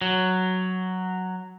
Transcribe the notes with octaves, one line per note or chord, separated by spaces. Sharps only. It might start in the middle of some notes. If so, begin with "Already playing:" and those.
F#3